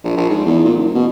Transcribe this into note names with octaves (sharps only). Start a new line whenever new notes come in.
A#1
A#1
G#2
E2
A#2
F#1
B2